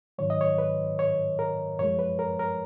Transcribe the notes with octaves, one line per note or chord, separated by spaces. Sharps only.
G#2 D#3 F#3 C#5
D#5
C#5
B4
C#5
A#4
F#2 F3 G#3 C#5
B4
A#4
A#4